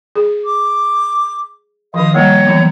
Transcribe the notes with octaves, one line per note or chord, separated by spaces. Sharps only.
G#4
D6
D#3 F3 D#5 F5 D#6
G3 A#3 C#5 G5 A#5
E3 F#3 B3